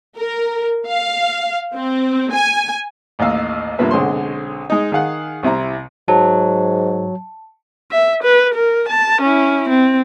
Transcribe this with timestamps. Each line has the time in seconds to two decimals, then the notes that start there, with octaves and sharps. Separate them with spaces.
0.17 A#4
0.87 F5
1.74 C4
2.33 G#5
3.19 A1 D#2 D#5 F5 E6
3.78 G2 C3 F3 A#3 B4 E5
3.91 B1 D3 G#3 C4 C#5 C6
4.70 G#3 D#4
4.92 D#3 G#4 F5 F#5
5.43 C2 C3 E4 A#5
6.08 G#2 F#3 A5
7.91 E5
8.24 B4
8.54 A#4
8.89 A5
9.22 C#4 E4
9.69 C4